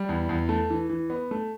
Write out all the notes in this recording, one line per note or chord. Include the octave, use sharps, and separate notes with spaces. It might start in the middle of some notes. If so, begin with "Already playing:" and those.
Already playing: G3
E2
E2
A3
E3
E3
B3
A3